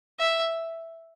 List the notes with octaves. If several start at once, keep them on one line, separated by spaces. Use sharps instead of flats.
E5